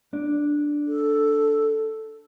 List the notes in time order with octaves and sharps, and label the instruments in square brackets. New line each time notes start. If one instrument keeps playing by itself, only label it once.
[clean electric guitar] D4
[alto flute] A4